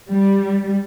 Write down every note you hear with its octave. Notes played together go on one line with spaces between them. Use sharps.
G3